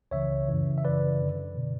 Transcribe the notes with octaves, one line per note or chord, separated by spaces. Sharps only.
C#2 C#3 E3 C#5 E5
F#2 C#3 E3
E5
F#2 C#3 E3 B4 D5
F#2 D3
B2